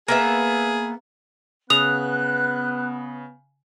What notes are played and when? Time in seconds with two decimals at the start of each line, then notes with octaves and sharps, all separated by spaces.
0.08 A#3 B3 G#4 E5
1.70 C#3 B3 D#6 F#6 F7